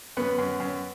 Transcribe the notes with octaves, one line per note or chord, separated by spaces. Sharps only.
F#2 B3
F#2
F#2